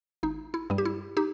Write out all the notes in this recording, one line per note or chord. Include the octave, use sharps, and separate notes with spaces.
G#1 D#4
E4
G2 G3
G4
E4
D#4 G4